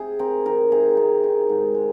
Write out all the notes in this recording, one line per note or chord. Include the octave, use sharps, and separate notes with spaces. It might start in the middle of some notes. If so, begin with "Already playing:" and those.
Already playing: C3 G#4
C4 A#4
D#3 A#4
C3 G#4
C3
D#3
G#2
G#3